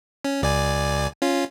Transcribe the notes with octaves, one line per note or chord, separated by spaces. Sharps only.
C#4
C#2 D5 G#5
C#4 F4